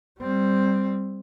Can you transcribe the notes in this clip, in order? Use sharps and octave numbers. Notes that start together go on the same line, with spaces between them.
G3 C4